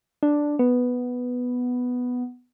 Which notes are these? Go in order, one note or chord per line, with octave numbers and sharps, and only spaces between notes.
D4
B3